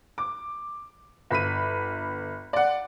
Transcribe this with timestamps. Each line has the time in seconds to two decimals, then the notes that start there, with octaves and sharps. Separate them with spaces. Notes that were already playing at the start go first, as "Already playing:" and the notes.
0.18 D6
1.31 G1 B5 B6 D#7
2.53 D5 F#5